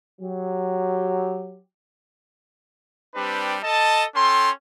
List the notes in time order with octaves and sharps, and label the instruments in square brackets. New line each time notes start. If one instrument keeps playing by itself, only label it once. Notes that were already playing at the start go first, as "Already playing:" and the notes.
[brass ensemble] F#3 G4
[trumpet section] G3 C4 D4 G4 B4
A4 D#5 A5
C#4 A4 G5 C6